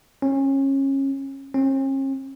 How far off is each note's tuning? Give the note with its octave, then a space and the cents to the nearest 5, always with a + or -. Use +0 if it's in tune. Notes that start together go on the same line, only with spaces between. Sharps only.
C#4 -25
C#4 -45